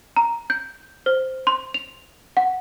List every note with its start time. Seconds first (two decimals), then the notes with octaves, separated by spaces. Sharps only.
0.16 A#5
0.50 G6
1.06 C5
1.47 C6
1.74 F7
2.37 F#5